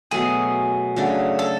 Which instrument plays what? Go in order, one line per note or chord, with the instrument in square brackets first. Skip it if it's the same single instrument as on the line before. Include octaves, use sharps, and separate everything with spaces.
[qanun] B2 F#3 A3 [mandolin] G#4
[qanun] C#3 F#3 A3 D4
[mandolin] A4